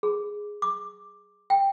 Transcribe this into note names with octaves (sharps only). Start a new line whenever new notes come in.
G#4
D6
G5